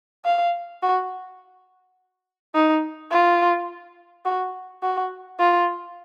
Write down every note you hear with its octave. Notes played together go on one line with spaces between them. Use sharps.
F5
F#4
D#4
F4
F#4
F#4
F4